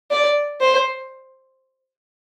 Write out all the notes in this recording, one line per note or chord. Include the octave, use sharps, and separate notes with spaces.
D5
C5